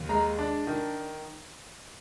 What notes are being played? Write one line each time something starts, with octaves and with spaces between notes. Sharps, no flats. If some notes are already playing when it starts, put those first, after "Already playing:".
Already playing: D#2
G#3 A#5
D4
D#3